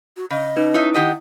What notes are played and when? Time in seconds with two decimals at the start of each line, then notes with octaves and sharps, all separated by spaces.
0.17 F#4
0.30 C#3 D#5
0.56 C#4 D#4 B4
0.74 D#4 E4 C#5 E5 D#6
0.94 D#3 G4 D#5 F#5